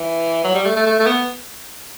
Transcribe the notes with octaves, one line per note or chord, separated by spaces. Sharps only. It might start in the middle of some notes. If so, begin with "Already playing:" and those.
Already playing: E3
F#3
G3
A3
A3
A3
A3
B3